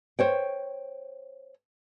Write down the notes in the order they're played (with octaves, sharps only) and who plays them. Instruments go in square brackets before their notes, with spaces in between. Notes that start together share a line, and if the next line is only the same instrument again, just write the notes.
[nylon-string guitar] C5 C#5 G5